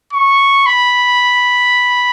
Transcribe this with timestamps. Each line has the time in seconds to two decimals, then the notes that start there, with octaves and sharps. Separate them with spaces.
0.13 C#6
0.66 B5